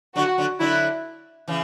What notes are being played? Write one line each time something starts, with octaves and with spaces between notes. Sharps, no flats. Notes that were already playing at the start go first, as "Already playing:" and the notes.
D3 F#3 F#4
D3 F#3
D3 F#3 E4
C#3 E3